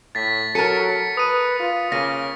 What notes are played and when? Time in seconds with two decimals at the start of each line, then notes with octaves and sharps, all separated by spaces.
0.15 A2 A6 B6
0.55 F#3 A4 A#4 C#7 D#7
1.17 B4 D#6 D#7
1.60 F4
1.92 C#3 A#3 A#6 D#7